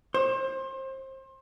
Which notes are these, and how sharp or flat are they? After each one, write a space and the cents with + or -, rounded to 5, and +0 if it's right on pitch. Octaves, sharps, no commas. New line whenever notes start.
C5 +30